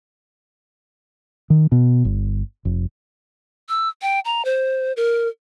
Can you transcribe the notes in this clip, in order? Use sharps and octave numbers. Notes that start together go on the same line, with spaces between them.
D#3
B2
G1
F1
E6
G5
A#5
C5
A#4